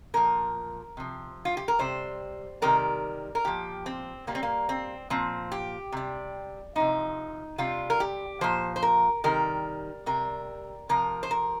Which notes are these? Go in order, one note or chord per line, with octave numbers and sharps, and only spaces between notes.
A#2 F3 A#4
C3 F3
F4
G4
A#4
C3 G3 C5
C3 D#3 G3 A#4
A#4
A#2 F3 G4
C4
A#2 G3 A#3
C4
A#3
C4
A#2 F3 C4
G4
C3 G3
C3 F3 D#4
C3 G3 F4
A#4
G4
A#2 F3 C5
C5
A#4
C3 D#3 G3 A#4
C3 G3 A#4
C3 F3 A#4
C5
A#4